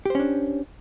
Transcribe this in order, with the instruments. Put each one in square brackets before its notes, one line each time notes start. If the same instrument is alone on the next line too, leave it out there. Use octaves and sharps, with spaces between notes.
[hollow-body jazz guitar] G4
C5
C#4
D4